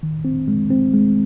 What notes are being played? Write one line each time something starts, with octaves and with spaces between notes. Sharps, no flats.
D#3
C4
G#3
C4
G#3